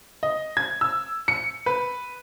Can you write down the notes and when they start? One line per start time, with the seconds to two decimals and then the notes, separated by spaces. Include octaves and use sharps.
0.23 D#5
0.57 G#6
0.81 E6
1.28 C#7
1.66 B4